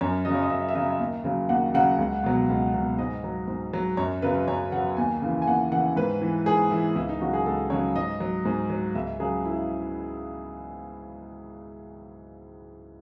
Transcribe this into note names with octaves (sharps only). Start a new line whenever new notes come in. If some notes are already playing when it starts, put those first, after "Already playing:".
F#2 C#5
C#3 F#3 D#5
C#5
D#5
F#2 E5
E5
C#3 F#3 D#5
D#2
C#3 F#3
D#2 F#5
C#3 F#3 F#5
C#2
B2 F#3
C#2
B2 F#3
G#2 D#5
F#3
G#2
F#3
F#2 C#5
C#3 F#3 B4
F#2 C#5
C#3 F#3 F#5
D#2 G#5
C#3 E3
G#5
D#2 F#5
C#3 E3 F#5
G#2 B4
E3
G#2 G#4
E3 E4
C#2 E4
D#4
C#3 F#3 F#4
G#4
C#2 A4
C#3 F#3 C#5
G#2 D#5
F#3
G#2
F#3
C#2 E5
C#3 F#3 G#4
E4